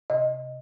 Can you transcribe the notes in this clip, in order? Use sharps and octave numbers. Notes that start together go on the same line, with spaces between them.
C3 D#5